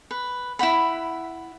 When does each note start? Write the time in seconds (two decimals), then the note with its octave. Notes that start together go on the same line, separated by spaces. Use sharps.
0.11 B4
0.59 E4 F4 F#5 B5